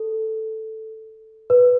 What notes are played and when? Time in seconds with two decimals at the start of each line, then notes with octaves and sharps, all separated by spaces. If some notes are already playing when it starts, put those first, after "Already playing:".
Already playing: A4
1.50 B4